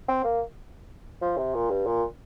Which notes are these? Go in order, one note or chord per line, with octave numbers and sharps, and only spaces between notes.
C4
A#3
F3
C3
A#2
G2
A#2